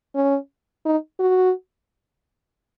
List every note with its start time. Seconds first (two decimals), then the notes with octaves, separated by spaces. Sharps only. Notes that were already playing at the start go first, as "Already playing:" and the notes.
0.15 C#4
0.86 D#4
1.20 F#4